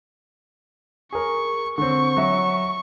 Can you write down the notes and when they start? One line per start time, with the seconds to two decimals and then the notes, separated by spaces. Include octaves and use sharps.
1.12 G#4 A#4 C#6
1.78 D3 C4 C#6
2.17 F#3 E5